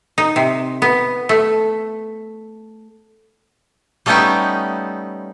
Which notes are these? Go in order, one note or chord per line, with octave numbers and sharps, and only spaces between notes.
D#4
C3
B3
A3
G3 A3 B3 C#4 D#4 G4